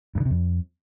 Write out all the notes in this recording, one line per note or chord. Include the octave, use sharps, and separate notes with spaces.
G2
D3
C3
F2